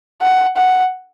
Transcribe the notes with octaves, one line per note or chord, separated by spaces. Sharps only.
F#5
F#5